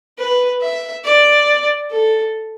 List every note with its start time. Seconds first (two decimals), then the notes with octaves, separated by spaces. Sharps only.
0.18 B4
0.61 E5
1.04 D5
1.91 A4